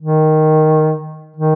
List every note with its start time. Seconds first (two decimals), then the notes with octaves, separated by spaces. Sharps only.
0.02 D#3
1.36 D#3